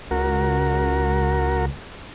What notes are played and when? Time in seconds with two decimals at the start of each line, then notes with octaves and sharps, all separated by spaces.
0.11 C#2 F#4 A#4